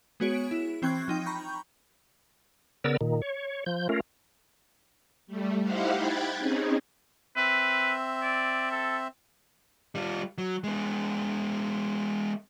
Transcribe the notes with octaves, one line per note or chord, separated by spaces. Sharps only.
G#3 B3 F#4 G#4 C#5 D7
E4
E3 C4 G5 C#6 F#6 G#6
F3 D#4 G5
A#5 B5 C#6 G6
C#3 B3 A#4 D5 E6
A#2 D#3
C#5
F3 G6
A3 C#4 F4 A#4
G3 A3
D#4 E4 G4 C5 F5 F#5
G5 B5 F#6 G#6 A6
C4 C#4 D#4 G#4
C4 B4 E5
D5
A4
G3 F4
F#3
G#3 B3